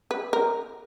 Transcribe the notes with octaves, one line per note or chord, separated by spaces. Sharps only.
B4
A#4